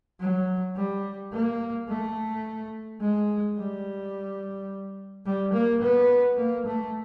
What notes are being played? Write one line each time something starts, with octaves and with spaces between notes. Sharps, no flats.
F#3
G3
A#3
A3
G#3
G3
G3
A#3
B3
A#3
A3